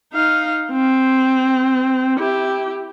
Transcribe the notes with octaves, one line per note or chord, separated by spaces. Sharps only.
D#4 F5
C4
E4 G4